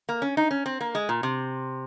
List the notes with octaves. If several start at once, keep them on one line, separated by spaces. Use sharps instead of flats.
A#3
C#4
D#4
C#4
C4
A#3
G#3
A#2
C3